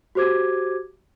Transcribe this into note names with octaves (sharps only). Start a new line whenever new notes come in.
F#4 G4 C5 D6 G#6